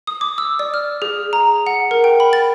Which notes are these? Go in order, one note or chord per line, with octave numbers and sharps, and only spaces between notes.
D#6
D6
E6
D5
F6
G#4
A#5
F#5
A#4
G5
B5
A6